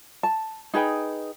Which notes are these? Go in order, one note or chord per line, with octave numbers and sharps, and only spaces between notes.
A5
D#4 G#4 B4 G5